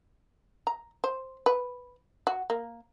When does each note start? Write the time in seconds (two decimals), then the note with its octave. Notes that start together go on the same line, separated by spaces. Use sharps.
0.67 A#5
1.04 C5
1.46 B4
2.27 F#4
2.50 A#3